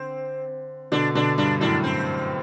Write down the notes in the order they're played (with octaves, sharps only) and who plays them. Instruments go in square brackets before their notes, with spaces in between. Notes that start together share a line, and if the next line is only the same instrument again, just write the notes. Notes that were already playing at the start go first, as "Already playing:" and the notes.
Already playing: [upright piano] D3 [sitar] C4
[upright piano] B2 D3 [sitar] D4
[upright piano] B2 D3 [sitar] D4
[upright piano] G2 [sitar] D4
[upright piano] F#2 A2 [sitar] D4
[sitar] C4